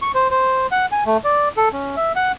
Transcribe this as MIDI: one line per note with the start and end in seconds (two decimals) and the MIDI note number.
0.02 0.12 85
0.15 0.28 72
0.31 0.67 72
0.71 0.86 78
0.92 1.04 80
1.06 1.17 57
1.24 1.49 74
1.57 1.69 69
1.73 1.96 61
1.97 2.12 76
2.16 2.32 78